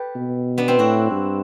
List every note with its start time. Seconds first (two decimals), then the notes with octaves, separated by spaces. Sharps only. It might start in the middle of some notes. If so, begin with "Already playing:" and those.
Already playing: G4 A4 B4
0.15 B2
0.58 B3 D4
0.68 C4 E4
0.79 A2 D4 F#4
1.11 G2